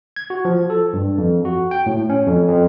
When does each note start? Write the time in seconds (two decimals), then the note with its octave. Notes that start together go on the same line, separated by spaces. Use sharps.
0.16 G#6
0.30 F#4
0.45 F3
0.70 A4
0.93 G2
1.18 F2
1.45 F#4
1.71 G5
1.86 A2
2.09 C#4
2.27 F2
2.48 F2